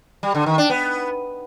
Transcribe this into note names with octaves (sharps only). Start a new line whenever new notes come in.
G3
D3
D#3
D4
B3